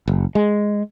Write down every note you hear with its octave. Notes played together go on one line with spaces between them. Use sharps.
F#1
G#3